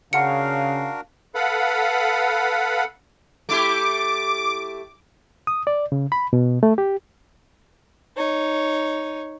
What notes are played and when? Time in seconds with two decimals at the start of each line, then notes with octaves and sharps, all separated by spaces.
0.13 C#3 D4 F#4 A#4 F5 F#5 C#7
1.35 A4 B4 F5 F#5 B5
3.49 A3 E4 G4 D6
5.47 D#6
5.67 D5
5.92 C#3
6.12 B5
6.33 B2
6.63 A3
6.78 G4
8.17 D#4 C#5